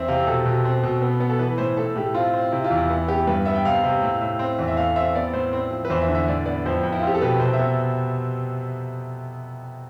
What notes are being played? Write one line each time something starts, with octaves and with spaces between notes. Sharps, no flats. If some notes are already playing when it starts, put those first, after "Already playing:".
Already playing: E2 C4 E5
C3 F5
B2 A4
B2
C4
B2
B3
B3
A4
E3 B4
A2 C5
A2 A4
A2 G4
C4 F4
C4
C3 E4
F4
E2
E4
B3 E4
B3 G4
G2 B4
B3 E5
G5
C3 F5
C3
A2
A2
C4
E2
E5
A3 F5
C4 E5
B3 D5
A2 C5
C4
F3
B4
E2 C5
E5
D3
E5
A2 D5
B3 D5
F2 C5
F2
E4
F4
C4 G4
A4
B2 B4
C3 C5
E5
B3